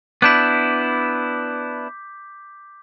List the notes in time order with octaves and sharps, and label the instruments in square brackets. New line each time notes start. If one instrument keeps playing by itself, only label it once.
[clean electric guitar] B3 D4 E4 [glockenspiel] D6 G6 B6